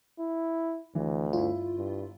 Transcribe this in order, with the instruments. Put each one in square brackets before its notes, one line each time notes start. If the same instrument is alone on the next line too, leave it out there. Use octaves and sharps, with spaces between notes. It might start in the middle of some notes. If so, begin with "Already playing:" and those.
[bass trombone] E4
[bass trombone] D2 [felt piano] E3
[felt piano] G1 E4 [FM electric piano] F4
[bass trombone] G2